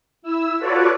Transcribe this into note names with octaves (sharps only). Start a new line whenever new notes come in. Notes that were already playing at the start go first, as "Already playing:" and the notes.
E4 E6
F4 F#4 A4 B4 C#5 D5